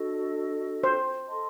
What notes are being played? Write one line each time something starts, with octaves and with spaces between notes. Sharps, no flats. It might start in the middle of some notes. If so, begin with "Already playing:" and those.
Already playing: D4 F#4 A4 D#5
C5
A4 D#5 A5 C6